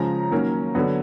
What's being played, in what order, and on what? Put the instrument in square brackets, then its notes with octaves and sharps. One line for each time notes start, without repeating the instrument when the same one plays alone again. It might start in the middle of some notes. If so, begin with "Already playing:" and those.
Already playing: [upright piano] C#3 F3 G#3 C#4 A#5
D#3 F#3 A#3 C#4
D3 F#3 B3